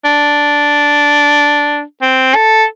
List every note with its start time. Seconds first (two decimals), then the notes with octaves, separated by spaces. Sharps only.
0.05 D4
2.02 C4
2.35 A4